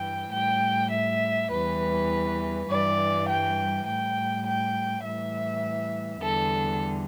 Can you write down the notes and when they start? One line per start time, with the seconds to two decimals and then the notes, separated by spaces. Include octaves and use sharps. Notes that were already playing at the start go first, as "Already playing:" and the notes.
Already playing: G2 E3 G3 G5
0.32 A2 G3 G5
0.92 E5
1.51 E2 E3 G3 B4
2.69 G2 E3 G3 D5
3.28 G5
3.86 A2 G3 G5
4.46 G5
5.04 A2 E3 G3 E5
6.22 E2 D3 G3 A4